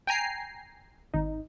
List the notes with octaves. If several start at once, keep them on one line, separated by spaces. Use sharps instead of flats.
G5 G#5 A#5 C7
G#1 D#4